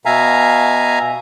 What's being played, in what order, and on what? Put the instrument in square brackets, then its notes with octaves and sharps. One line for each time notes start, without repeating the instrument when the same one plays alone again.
[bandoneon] B2 E5 F5 G#5 A#5